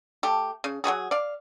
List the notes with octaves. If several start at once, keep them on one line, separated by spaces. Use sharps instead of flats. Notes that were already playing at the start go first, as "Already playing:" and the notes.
A3 G4
C#3
F#3 G3 F#4 G#4
D5 F5